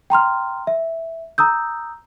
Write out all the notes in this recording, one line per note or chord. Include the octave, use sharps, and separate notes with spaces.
G5 A#5 C6 F6
E5
A#5 D#6 E6 G6